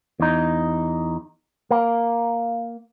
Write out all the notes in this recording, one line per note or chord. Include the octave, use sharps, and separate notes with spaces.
E2 D#4
A#3